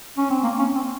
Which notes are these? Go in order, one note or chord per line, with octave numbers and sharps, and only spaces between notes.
C#4
C4
A#3
C#4
C4